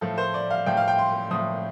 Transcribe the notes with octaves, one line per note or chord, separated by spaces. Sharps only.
A2 F3 A4
C5
D5
F5
A2 F3 G5
F5
G5
C6
A2 F3 D#6